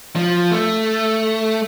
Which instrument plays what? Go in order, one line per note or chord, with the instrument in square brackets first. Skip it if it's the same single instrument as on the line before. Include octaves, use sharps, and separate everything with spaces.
[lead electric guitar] F3
A3